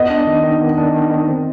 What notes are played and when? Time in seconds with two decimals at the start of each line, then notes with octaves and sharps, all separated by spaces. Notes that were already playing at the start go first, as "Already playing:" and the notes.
Already playing: B3 D#5
0.10 D4
0.27 D#3
0.44 D#3
0.61 B3
0.78 D4
0.94 D#3
1.11 D#3
1.28 C4